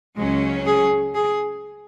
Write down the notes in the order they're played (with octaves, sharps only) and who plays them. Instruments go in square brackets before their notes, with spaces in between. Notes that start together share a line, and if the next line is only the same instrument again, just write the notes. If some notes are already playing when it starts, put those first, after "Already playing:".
[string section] C#2 C#3 F#3 C#4 [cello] G#3
[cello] G#4
G#4